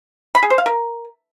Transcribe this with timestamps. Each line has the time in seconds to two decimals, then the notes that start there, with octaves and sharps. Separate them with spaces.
0.35 B5
0.43 G#4
0.50 C5
0.58 F5
0.66 A#4